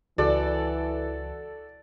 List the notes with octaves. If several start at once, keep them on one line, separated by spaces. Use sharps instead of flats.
C#2 E3 F#4 A4 D5